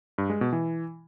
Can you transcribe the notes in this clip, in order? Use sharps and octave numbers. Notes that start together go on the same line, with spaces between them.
G2
G#3
B2
E3